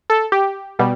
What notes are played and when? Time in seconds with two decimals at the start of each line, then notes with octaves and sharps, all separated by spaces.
0.10 A4
0.32 G4
0.79 B2 G3